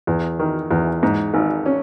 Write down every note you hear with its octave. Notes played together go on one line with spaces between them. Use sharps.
E2
D#3
E2
G#2
G#1
C#4